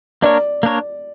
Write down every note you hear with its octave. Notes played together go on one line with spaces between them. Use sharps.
A#3 D4 A#4 C#5 D5
A#3 D4 A#4 C#5